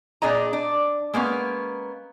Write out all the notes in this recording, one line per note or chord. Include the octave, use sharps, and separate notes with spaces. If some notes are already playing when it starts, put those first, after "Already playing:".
A#2 D4 G#4 D#5 A#5
D4
G#3 A#3 B3 C#4